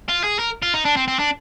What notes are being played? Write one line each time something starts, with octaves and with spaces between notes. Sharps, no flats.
F4
G#4
A#4
F4
D#4
D4
C4
C4
D4